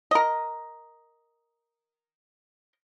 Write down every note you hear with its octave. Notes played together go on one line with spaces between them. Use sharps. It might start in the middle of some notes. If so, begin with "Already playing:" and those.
A#4 D#5